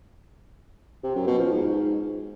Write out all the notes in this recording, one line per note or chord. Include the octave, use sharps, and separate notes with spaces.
C3
F#2
B2
F3
G#2